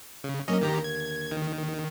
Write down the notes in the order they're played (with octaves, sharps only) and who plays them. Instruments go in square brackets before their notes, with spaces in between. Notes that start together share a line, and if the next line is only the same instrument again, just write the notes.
[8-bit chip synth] C#3
[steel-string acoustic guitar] F#3 A#3 [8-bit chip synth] C#4 D#5
[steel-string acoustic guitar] D#2 D3 [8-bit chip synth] D#3 G4 A#5
[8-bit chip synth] G#6
D#3